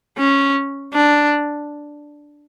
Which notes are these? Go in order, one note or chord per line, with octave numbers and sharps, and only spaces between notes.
C#4
D4